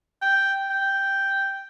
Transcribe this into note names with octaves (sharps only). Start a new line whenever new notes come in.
G5
G5